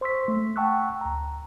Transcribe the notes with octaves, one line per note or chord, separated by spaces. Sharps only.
C5 C6 C#6 E6 B6
A3
F#5 G5 A5 C#6 E6 F#6
D2 A#5